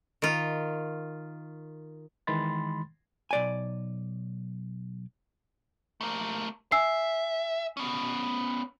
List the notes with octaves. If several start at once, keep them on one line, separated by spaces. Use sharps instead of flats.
D#3 F4
D#3 E3 G#3 B5 C6 A6
B1 D5 G#5
A3 A#3
E5 G#5 E6 C7
B3 C#4